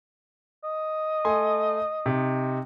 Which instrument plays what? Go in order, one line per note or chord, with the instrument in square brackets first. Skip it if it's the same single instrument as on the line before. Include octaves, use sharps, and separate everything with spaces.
[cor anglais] D#5
[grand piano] A3 G#5 C6
C3 D#4